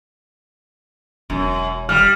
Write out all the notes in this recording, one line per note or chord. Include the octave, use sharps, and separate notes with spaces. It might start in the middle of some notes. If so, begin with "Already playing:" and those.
E1 F#2
G3 F6